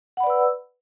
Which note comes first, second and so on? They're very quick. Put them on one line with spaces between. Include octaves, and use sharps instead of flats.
F#5 B5 D5 B4 E6